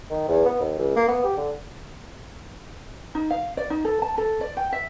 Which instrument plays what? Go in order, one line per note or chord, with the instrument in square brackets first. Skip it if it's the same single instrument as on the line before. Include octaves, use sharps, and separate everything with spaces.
[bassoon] D#3
E2
B3
D#2
C#2
A#3
B3
G4
D3
[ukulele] D#4
F5
D5
D#4
A4
A5
A4
D5
G5
E5